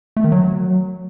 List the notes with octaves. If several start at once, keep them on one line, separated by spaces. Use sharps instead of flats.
A3
D#3
F#3